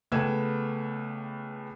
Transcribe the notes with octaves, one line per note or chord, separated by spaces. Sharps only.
C#2 A3 B3 G5 G#6 E7